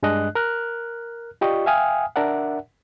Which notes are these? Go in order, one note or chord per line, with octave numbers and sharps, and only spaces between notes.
G2 G#3 D4 D#5 F#6
A#4 F6 F#6
F4 G4 D5 D#5 C#6
E5 F5 G5 G#5 D#6 F6
D4 A#4 D5 E5 F#5